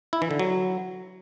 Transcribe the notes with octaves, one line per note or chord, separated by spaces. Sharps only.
E4
E3
D3
F#3